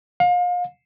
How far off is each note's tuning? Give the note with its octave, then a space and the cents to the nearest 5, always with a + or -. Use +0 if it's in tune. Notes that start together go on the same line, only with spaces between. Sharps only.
F5 +35